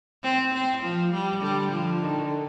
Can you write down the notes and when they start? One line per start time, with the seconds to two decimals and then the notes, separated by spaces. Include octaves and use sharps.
0.24 C4
0.53 C4
0.83 F3
1.13 G3
1.42 D3 G3
1.72 F3
2.02 D#3